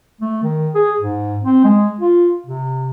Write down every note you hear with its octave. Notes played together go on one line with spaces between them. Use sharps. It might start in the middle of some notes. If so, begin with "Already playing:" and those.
A3
D#3
G#4
G#2
C4
G#3
F4
C3